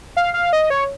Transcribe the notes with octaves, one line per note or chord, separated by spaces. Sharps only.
F5
F5
D#5
C#5